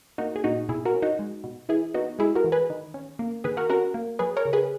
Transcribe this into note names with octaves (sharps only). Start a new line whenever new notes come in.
A#3 D#4 F#4
G#4
A#2 D#4 F#4
B2 E4 G#4
F#4 A#4
C#4
D#4 F#4
G#3
B2
E3 E4 G#4
B3 D#4 F#4
G#3 E4 G#4
F#4 A#4
E3
G#4 B4
D#3
C#4
A#3
D#3 G#4 B4
F#4 A#4
C#4 F#4 A#4
A#3
F#3 G#4 B4
A#4 C#5
C#3
G#4 B4